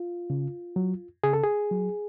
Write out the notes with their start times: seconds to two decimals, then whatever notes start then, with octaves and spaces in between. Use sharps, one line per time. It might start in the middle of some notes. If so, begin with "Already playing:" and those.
Already playing: F4
0.30 C#3
0.76 F#3
1.24 C#3 G#4
1.33 A4
1.44 G#4
1.71 F#3